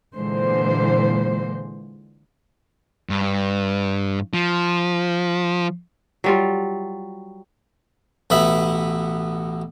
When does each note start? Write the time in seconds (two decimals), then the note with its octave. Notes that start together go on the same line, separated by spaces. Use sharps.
0.15 A#2 D3 E3 G#3 C5
3.10 G2
4.34 F3
6.24 F#3 G3 F4
8.30 A1 B2 B3 E5 B5